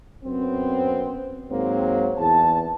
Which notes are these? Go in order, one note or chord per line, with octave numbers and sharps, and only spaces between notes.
F#2 B3 C4
G#2 F#3 A#3 C4
E2 A5